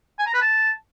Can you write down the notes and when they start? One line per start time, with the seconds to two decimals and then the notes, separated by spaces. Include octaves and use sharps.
0.19 G#5
0.26 A#5
0.34 B4
0.41 A5